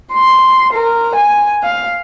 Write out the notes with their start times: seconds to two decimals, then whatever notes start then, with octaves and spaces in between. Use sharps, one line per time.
0.13 C6
0.73 A#4
1.16 G#5
1.63 F5